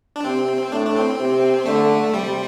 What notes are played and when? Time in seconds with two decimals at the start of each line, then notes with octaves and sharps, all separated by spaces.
0.16 D4
0.24 C3 C4
0.72 A2 D4
0.86 D4
0.96 C4
1.19 C3
1.66 D3 A3
2.14 C3 G3